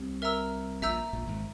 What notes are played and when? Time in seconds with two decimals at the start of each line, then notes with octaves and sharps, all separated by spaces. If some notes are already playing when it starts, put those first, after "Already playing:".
Already playing: C2 C3
0.22 A#4 E5 A#5 E6
0.82 A#1 A#2 E5 A#5 E6 G6
1.13 A#1 A#2
1.27 G#1 G#2